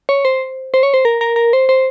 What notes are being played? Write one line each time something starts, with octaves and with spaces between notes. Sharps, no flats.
C#5
C5
C5
C#5
C5
A#4
A#4
A#4
C5
C5